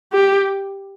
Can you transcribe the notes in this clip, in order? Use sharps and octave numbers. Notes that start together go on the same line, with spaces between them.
G4